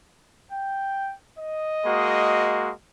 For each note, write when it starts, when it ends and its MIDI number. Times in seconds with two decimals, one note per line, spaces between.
0.52 1.14 79
1.38 2.65 75
1.85 2.72 56
1.85 2.72 58
1.85 2.72 66